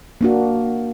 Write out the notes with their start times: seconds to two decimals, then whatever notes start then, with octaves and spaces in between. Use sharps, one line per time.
0.21 A#3 D4 F#4